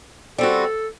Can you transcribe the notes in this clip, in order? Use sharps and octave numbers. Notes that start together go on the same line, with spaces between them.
G3 C4 F#4 A4